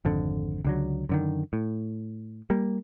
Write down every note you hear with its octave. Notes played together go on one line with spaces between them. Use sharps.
G#1 F2 D3
C#2 D3 F#3
F#2 D3 D#3
A2
G3 A#3